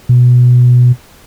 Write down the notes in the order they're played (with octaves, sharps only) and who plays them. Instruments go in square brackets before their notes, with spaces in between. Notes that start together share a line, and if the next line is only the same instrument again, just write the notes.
[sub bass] B2